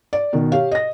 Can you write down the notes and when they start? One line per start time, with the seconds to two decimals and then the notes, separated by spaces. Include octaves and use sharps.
0.13 D5
0.33 B2 D#3
0.52 G4 C#5 F5
0.71 D#5 A#6